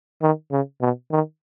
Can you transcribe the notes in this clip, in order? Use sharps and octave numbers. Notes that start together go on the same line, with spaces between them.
D#3
C#3
B2
D#3